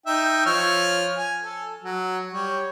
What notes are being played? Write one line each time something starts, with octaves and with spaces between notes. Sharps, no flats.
D#4 E5 G5
F3 C#5 F6
G#5
A4
F#3
G3 C#5